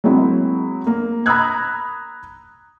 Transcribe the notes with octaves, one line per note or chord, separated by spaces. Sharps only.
F#3 G#3 A#3 C4 E4
A#3
A#5 B5 D#6 E6 F#6 G#6